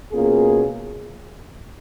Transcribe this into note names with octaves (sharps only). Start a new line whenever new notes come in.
B2 A#3 C#4 F4 G#4